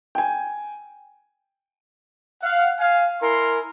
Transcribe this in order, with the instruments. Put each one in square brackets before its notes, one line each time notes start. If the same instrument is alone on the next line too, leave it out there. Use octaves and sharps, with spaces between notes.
[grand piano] G5 G#5
[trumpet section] F5 F#5
F5 G#5
E4 A#4 G#5 C6